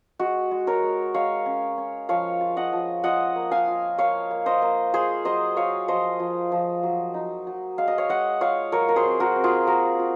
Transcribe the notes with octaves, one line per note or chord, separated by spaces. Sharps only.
G#3 F#4
G#3
A#4 C#5
G#3
G#3 C#5 F5
C#4
C#4
F3 C#5 F5
F4
D#5 F#5
F3
F4 D#5 F#5
A#3
F5 G#5
F4
A#3 C#5 F5
A#3
C5 D#5
A#3
F4 G#4 C5
F#3 C5 D#5
F4 C#5 F5
F3 C5 D#5
F3
F3
F#3
D#4
F#3
G#3 F5
D#5
C#5 F5
G#3 D#5 F#5
F4 C#5 F5
F#3 A#4 C#5
A#4
G#4 C5
C4
F#4 A#4
C4
F4 G#4
A#3 F#4 A#4
F4